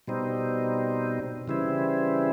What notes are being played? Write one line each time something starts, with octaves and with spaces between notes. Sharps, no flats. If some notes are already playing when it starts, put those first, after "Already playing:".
B2 G3 C4 D#4
C#3 E3 G3 C4 E4